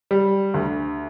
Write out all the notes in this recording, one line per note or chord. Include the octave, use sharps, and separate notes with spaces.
G3
D2